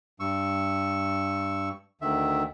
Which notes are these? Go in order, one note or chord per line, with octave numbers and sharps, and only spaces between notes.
G2 C#6 E6
D2 D#3 E5